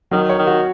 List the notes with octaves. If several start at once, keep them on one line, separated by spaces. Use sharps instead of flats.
D#3 F#3
C#5
D#3
F#4